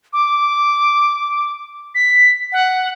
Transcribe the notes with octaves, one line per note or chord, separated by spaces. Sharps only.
D6
B6
F#5